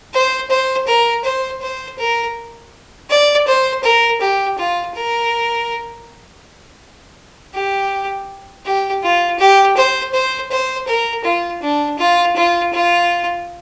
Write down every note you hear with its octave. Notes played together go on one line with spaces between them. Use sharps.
C5
C5
A#4
C5
C5
A#4
D5
C5
A#4
G4
F4
A#4
G4
G4
F4
G4
C5
C5
C5
A#4
F4
D4
F4
F4
F4